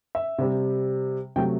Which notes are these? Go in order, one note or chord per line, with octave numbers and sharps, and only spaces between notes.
E5
C3 G3
C3 F#3 A3 G5